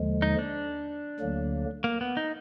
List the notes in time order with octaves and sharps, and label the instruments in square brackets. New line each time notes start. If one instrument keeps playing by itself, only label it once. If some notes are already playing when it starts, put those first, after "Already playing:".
Already playing: [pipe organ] D#2 D3 F3 G#3
[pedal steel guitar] D#4
D4
[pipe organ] D2 D3 F#3 A#3
[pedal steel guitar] A#3
B3
D#4